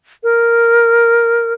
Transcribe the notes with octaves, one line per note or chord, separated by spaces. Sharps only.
A#4